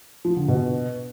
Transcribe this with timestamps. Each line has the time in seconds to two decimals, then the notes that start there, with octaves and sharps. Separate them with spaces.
0.25 F3
0.36 D3
0.48 B2